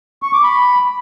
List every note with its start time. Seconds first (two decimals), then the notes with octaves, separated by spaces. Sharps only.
0.22 C#6
0.33 D6
0.44 B5